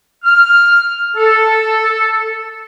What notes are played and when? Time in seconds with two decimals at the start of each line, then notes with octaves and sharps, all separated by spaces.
0.24 F6
1.16 A4